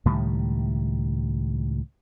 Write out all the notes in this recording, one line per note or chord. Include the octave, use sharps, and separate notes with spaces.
C#2 A2 D#3 G3